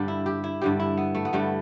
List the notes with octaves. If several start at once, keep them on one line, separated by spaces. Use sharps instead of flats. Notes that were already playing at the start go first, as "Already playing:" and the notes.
Already playing: G2 D3 G3 G4
E4
G4
E4
G2 D3 G3 G4
E4
B3
A3
B3
G2 D3 G3 A3